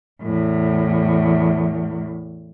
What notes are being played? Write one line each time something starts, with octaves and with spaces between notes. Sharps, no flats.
E2 A2